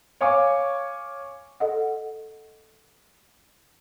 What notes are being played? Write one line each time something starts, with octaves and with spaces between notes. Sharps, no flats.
C#5 F5 G#5 C#6 D6
A4 D#5 F#5